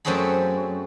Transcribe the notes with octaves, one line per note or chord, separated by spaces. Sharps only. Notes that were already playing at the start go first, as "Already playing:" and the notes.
F#2 A3 C4 F#4 G#4 B5